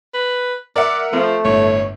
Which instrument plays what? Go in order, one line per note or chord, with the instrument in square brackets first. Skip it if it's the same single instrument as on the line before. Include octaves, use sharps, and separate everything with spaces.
[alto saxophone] B4
[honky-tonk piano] A#4 E5 F#5 [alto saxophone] D5
[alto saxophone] F3 [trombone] A3 [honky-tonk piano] C4
[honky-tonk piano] G1 A2 [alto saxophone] C#5